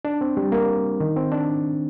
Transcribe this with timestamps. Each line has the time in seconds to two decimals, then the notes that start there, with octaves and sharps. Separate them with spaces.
0.05 D4
0.21 C4
0.37 G3
0.52 A#3
1.00 D#3
1.17 C4
1.32 D4